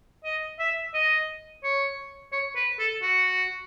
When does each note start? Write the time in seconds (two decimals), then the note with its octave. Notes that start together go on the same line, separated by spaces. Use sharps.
0.25 D#5
0.59 E5
0.94 D#5
1.63 C#5
2.32 C#5
2.56 B4
2.79 A4
3.02 F#4